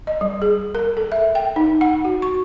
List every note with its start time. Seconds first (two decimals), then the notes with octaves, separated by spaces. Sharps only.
0.07 D#5
0.21 G3
0.42 G#4
0.75 A#4
0.97 A4
1.12 E5
1.35 G5
1.56 D#4
1.81 F#5
2.05 F#4
2.22 C#6